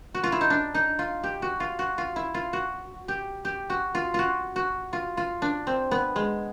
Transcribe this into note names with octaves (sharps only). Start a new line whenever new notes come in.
F#4
F4
E4
D#4
D4
D#4
F4
G4
F#4
F4
F#4
F4
E4
F4
F#4
G4
G4
F#4
F4
F4 F#4
F#4
F4
F4
D4
C4
B3
G#3